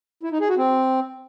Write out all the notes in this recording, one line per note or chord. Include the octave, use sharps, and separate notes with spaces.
E4
D#4
G#4
F#4
C4